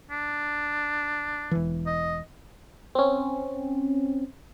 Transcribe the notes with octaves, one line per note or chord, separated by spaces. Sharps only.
D4
E1 E3
D#5
C4 C#4